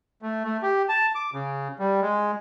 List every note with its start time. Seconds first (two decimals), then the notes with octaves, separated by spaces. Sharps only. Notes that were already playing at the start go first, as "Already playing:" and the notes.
0.22 A3
0.44 A3
0.63 G4
0.89 A5
1.15 D6
1.34 C#3
1.79 G3
2.02 G#3